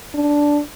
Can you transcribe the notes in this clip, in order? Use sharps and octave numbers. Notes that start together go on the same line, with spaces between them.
D4